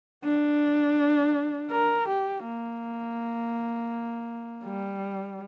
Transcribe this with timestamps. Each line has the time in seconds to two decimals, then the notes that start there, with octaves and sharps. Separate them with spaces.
0.24 D4
1.71 A#4
2.08 G4
2.45 A#3
4.64 G3